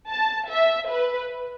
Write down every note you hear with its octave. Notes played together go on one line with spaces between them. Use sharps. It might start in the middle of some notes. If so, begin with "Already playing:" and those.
A5
E5
B4